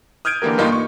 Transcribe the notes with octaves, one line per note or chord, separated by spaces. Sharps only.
D#6 F6 G6 G#6 D7 D#7
D3 E3 A#3 G4 A#4
G2 A#3 D#4 F4 G4 C6
C#6